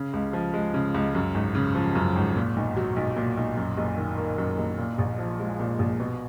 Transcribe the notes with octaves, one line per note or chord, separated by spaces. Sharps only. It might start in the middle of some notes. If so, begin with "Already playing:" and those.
Already playing: C#3
C#2
F3
G#3
C#3
C#2
F#2
G#1
C#3
F3
F#2
G#1
A#2
B1
F#3
B1
A#2
B1
F#2
F#1
D#3
A#3
F#2
F#1
A#2
A#1
F3
G#3
A#2
A#1
B2